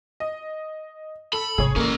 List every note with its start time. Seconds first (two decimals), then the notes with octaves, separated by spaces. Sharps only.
0.20 D#5
1.33 A4 B5
1.58 G#1 C3 G#4 C#5
1.76 E3 A#3 C#4 A4